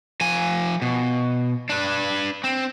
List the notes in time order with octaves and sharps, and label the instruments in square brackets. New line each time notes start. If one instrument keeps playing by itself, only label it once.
[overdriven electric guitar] F3 G#5
B2
D4 B4
C4